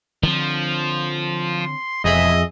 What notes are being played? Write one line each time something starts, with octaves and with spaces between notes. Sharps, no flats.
D3 F3 C4
C6
E1 F2 G#4 D#5 E5